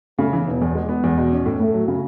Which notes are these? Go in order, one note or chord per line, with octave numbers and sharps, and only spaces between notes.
C#3 A3
E3
E1 B3
E2
G#3
B3
E2
B2
C#4
A2
A2 A3
F#3
C#3